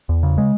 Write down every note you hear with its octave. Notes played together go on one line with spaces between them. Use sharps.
E2
C#3
G#3